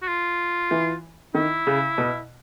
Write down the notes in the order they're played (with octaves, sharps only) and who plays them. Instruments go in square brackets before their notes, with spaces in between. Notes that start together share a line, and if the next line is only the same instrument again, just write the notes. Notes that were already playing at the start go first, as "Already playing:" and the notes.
[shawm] F#4
F4
[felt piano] E3
[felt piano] D#3 [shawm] E4
[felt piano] C#3
B2